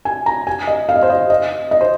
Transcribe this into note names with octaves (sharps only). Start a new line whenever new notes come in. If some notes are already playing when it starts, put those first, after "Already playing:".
G#5
A#5
G#5
D#5
F5
D#5
C5
D#5
D#5
D#5
C5